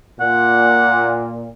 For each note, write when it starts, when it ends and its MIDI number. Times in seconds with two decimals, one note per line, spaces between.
0.20 1.50 46
0.20 1.24 78